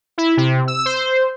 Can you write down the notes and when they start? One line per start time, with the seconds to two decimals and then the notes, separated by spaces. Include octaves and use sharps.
0.18 E4
0.37 C3
0.68 E6
0.86 C5